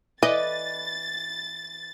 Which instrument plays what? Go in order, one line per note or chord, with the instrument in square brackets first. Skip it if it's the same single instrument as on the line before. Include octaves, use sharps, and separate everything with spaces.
[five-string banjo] E3 B4 D5 [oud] D#5 [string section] A6